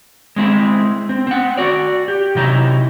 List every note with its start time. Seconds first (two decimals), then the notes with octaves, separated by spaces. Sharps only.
0.36 G#3 C4 E4
1.09 C4
1.27 C4 F#5
1.57 F#4 D5
2.08 G4
2.35 C3 F#3 D#4 E4